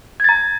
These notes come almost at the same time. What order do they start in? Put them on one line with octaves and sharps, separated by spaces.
G#6 A6 A#5